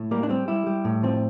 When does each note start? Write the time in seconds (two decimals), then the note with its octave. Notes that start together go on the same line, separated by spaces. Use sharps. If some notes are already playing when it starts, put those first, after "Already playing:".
Already playing: A2
0.11 G3 A#3
0.23 D4
0.29 G3 C4
0.48 G3 E4
0.67 G3
0.85 A2
1.03 F3 C4